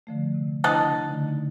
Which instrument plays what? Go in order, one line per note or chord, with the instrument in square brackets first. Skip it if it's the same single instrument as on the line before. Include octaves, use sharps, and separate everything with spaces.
[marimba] D3 F3 A3
C3
[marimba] D4 E4 [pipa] D#5 F#5 A5
[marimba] C#3
D3 A3 D#4